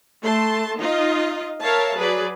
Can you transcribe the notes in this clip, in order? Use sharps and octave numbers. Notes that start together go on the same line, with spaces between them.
A3 A5 C6
D#4 F4 D#5
A#4 C#5 E5 F5 A5
F#3 G#4 B4 D5